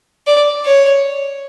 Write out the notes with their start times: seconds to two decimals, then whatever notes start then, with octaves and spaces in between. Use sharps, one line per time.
0.27 D5
0.65 C#5